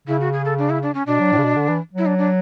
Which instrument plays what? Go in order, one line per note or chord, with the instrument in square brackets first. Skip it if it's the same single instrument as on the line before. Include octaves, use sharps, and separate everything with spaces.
[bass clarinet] C#3 [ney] E4
[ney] F#4
G#4
A4
D4
E4
D4
C#4
[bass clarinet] B2 [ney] D4
[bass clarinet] F#3
A2
C#3
B2
D3
E3
[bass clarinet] F#3 [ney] E4
[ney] D4
D4